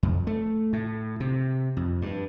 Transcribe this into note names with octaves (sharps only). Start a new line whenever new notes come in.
F2
A3
A2
C3
F2
G2